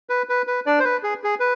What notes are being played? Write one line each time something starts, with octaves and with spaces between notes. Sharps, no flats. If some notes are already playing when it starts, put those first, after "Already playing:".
B4
B4
B4
D4 D5
C5
B4
G#4
G#4
B4